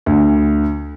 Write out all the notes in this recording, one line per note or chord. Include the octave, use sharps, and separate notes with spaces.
D2